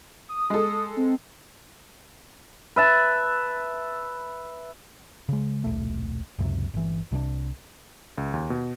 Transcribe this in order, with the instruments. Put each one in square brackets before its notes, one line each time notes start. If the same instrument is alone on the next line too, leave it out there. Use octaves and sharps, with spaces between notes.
[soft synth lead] D#6
[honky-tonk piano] G#3 A4
[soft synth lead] C4
[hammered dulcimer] B4 E5 A5
[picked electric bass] C#3 G#3
D#1 B1 A3
C#2 F#2 A2 C3
G1 E3
C2 C3 E3 D4
[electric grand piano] C#2
D#2
B2